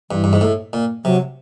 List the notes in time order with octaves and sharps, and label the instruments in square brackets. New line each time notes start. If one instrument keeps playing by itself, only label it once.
[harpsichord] G2 [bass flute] E3
[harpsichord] G2
G#2
A2
A#2
[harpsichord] C3 [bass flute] F#3